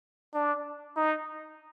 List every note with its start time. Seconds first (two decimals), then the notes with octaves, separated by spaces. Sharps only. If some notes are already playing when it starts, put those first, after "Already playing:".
0.34 D4
0.96 D#4